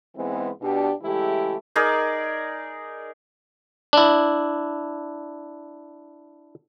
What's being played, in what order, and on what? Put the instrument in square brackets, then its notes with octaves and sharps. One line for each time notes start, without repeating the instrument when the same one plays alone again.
[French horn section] G#2 E3 G#3 B3 C4
B2 D4 G4
C#3 E3 G#3 A3 E4 G4
[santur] D#4 G#4 A#4 D5
[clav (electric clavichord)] D4 E4